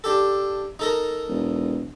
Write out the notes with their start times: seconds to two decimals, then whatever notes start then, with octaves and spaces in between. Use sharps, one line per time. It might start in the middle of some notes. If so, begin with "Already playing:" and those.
0.04 D4 G4 A4
0.79 D#4 A4 A#4
1.28 E1